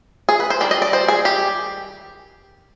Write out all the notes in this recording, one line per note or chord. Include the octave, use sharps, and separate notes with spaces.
G#4
B4
C5
D#3 G3 D4 D5
D#5
D5
C5
G#4
G4